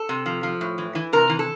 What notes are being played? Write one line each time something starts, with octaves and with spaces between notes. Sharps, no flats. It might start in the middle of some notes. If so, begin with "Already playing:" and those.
Already playing: A4
C3
F3
F3
A2
E3
E3
C3 A#4
E3
A4